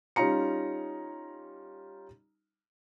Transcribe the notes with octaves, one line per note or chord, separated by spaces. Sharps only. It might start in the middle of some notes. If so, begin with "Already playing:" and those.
G3 C#4 D#4 F4 A#5 C#7